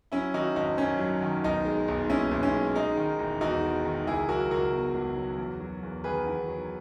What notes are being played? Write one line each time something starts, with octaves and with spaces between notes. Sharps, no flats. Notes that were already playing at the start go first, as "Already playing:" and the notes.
F#3 C#4 E4
D#3 D#4 F#4
G#1 D#4
F#2 C#4
F#3
D#3
B1 D#4
G#3
B1
A#2 C#4 E4
B1
C#4
G#3
G#3 D#4
D#3
E1
E2 D#4 F#4
G#3
D#3
C#2 E4 G#4
F#3 F#4 A#4
C#2 F#4 A#4
B2
C#2
F#3
E2
F#3
E2
D#3 G#4 B4
E2
F#3